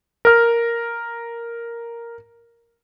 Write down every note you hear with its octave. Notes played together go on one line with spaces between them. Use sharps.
A#4 F6